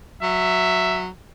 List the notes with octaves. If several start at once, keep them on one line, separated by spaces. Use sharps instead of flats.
F#3 E5